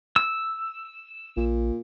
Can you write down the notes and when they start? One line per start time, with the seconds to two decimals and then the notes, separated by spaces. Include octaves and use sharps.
0.16 E6
1.37 A#1 A#2